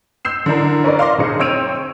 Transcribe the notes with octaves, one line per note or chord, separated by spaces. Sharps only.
E6 G6 C7 E7
D3 E3 D4 A#4
C#4 A#4 B4 D5
F5 C6 D6 A#6
B1 D3 D#4 G#4 C5 C#7
C4 C#5 E6 D7 D#7 F7